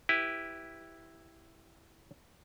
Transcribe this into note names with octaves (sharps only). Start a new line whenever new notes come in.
E4 G4 B4